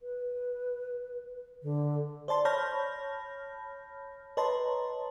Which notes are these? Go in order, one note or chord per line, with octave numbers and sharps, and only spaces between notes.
B4
D3
C5 D5 A5 C6
C#5 A5 B5 F6 G6 A#6
B4 C#5 D#5 A5 A#5 C6